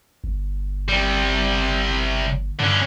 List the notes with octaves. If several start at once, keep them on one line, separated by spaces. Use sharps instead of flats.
G1
C3 G3
G2 D3 C#4